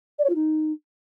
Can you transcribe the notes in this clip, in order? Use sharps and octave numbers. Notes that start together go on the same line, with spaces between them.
D5
C#5
F4
D#4